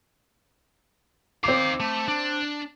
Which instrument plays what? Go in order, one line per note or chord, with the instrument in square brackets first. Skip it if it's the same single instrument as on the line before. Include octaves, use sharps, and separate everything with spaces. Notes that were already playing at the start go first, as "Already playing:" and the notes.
[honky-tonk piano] C4 D6 [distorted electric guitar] D#4 F5
[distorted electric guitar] A3
D4